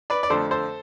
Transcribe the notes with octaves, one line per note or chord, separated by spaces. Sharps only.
B4 D5
D5
F2 D3 F3 A3 A4 C5
A4 C5